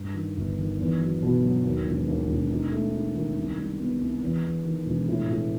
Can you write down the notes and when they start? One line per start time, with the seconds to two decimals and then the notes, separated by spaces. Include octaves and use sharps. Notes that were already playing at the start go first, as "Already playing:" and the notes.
Already playing: G2
0.14 D#3
0.37 G1
0.58 D#3
0.79 E2
1.01 F#3
1.23 B2
1.43 F#3
1.64 D#2
1.86 E1
2.08 D#2
2.30 E1
2.51 D#4
2.72 A3
2.93 D#4
3.15 D#3
3.37 C2
3.58 G3
3.80 B3
4.01 C2
4.23 E2
4.43 E2
4.65 D#3
4.86 E1
5.08 A2
5.29 A2